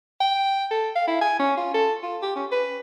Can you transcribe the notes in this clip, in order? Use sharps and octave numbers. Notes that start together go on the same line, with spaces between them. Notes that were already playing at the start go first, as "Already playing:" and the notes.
G5
A4
F5
E4
G#5
C#4
F4
A4
F4
G4
C#4
B4